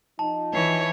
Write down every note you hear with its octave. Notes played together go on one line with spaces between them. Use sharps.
F3 D#4 A5
E3 C#5